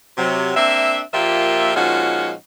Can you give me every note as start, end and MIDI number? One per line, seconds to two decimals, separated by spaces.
0.17 0.51 48
0.17 0.51 54
0.56 1.00 58
0.56 1.00 60
0.56 1.00 62
0.56 1.00 76
1.13 1.73 46
1.13 1.73 53
1.13 1.73 58
1.13 1.73 67
1.13 1.73 76
1.75 2.32 46
1.75 2.32 53
1.75 2.32 56
1.75 2.32 61
1.75 2.32 63
1.75 2.32 66